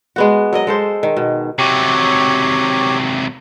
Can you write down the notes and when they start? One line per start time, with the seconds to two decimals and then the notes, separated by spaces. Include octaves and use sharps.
0.16 G#3 B3 F#4
0.53 F#3 A#4 D#5
0.67 G#3 A4 C5
1.03 D#3
1.17 B2
1.59 C3 F#3 G4 C#5